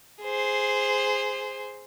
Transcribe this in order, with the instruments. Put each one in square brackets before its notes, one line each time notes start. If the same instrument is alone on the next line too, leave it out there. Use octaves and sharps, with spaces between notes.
[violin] G#4 C5